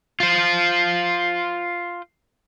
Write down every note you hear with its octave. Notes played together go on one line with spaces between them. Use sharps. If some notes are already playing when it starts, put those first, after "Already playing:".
F4 C5